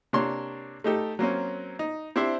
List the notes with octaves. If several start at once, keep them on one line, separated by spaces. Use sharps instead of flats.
C3 A#3 D4 C#5 C6
A3 D#4 G4 A4
F#3 A#3 C4 C#4
D#4
C4 D4 E4 G4 C5 E5